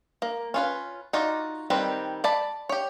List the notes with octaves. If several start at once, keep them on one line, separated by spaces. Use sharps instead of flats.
A#3
C#4 F4 B4
D#4 F4 F#4 D5
D#3 G3 C4 B4
D5 A5 B5
G4 C#5